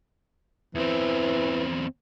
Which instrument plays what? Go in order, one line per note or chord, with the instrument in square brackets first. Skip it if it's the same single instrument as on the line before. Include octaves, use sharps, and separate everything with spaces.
[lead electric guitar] E2 C4 [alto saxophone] E3